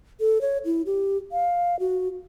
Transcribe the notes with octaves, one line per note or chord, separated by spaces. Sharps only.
A4
C#5
E4
G4
F5
F#4